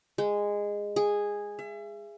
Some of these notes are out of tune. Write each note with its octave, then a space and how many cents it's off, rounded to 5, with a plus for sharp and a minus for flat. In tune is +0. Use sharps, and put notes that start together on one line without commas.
G#3 -15
G#4 -10
E5 +35